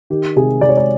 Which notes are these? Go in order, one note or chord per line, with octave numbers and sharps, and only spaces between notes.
D#3 G4
C3 G#4
C3 D5
C#5
D5